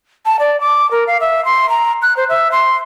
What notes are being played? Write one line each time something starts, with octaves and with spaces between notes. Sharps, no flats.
A5
D5
D6
A#4
F5
E5
C6
A#5
F#6
C5
E5
C6